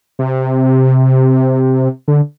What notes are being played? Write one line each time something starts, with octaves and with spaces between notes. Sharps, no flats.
C3
D3